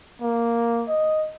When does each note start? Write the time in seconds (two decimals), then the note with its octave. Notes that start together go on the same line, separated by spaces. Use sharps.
0.22 A#3
0.88 D#5